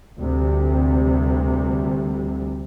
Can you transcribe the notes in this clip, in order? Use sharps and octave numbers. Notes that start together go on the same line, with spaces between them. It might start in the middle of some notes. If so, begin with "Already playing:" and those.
F1 D2 C3 G3